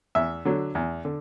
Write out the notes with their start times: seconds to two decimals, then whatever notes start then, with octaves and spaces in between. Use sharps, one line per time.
0.15 E2 E5
0.45 D3 F#3
0.75 E2
1.05 D3